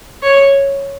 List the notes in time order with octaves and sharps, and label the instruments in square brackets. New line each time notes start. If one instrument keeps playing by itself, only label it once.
[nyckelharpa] C#5